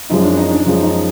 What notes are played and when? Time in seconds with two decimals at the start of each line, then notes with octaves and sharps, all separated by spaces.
0.10 F#2 F3 G#3 D#4
0.23 D4
0.37 D#4
0.51 D4
0.64 F#2 F3 G#3 D#4
0.83 D#4